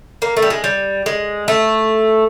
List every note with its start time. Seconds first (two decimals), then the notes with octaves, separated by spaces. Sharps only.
0.22 A#3
0.37 A3
0.42 G3
0.50 G#3
0.64 G3
1.06 G#3
1.48 A3